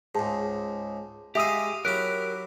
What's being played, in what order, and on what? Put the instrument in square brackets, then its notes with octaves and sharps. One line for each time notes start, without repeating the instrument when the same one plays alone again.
[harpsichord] C#2 G#2 [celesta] G#4 A5
[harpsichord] G#3 F5 [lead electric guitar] G4 G#4 [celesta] E5 D#6 E6
[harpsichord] F#3 E4 [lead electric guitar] G4 A#4 [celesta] F#6